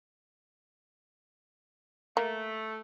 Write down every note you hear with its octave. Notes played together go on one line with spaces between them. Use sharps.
A3 A#3